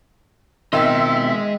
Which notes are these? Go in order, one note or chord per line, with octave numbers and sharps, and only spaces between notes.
B2 D#3 G#3 C4 F4 D#5 E5